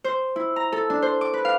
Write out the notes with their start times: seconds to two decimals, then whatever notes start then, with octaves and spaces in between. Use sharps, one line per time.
0.04 C5
0.36 E4
0.56 A#5
0.72 A4
0.90 D4
1.02 C5
1.21 D6
1.33 B4
1.45 F5